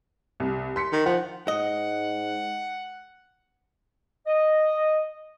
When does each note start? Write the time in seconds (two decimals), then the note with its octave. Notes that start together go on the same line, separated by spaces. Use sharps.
0.40 C2
0.76 C6 B6 C#7
0.93 D#3
1.06 F3 F#5
1.48 G#2 D#5 F#5
4.26 D#5